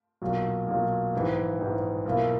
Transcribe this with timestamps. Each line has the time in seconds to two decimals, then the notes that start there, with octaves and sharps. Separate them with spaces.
0.22 B1 A#2 F#3
0.67 B1 A#2 F#3
1.13 A#1 G#2 E3
1.59 A#1 G#2 E3
2.06 B1 A#2 A#3 E4